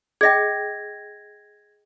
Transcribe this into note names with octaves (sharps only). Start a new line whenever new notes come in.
G#4 D#5 G5 G#6 A#6